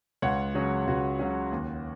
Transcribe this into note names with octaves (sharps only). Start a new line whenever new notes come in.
C#2 C#5 F#5
C#3 F#3 C#4 F#4
C#2 F#4
C#3 F#3 C#4
D#2